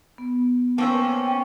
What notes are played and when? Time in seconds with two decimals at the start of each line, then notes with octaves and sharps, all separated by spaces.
0.18 B3
0.78 A#3 B3 C#4 C5 G5 A5 E6